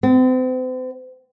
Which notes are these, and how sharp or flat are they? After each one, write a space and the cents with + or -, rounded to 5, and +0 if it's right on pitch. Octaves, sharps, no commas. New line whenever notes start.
C4 -40